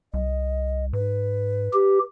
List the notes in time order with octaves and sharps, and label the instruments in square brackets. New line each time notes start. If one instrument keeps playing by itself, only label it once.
[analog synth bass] C2 [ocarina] D#5
[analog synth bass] G#2 [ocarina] B4
[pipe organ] G4